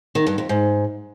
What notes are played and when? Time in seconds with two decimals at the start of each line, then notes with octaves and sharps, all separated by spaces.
0.15 D#3
0.27 G2
0.38 F2
0.49 G#2